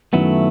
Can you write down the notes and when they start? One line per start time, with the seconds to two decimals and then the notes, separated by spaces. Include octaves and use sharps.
0.13 F#2 D#3 F#3 A3 B3 E4